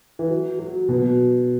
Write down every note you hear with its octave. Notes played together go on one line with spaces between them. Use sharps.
E3
F#3
F#3
B2